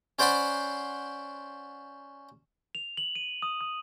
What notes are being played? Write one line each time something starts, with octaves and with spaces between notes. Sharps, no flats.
C#4 C5 D5 F#5 B5 C6
F7
F#7
D#7
D#6
D#6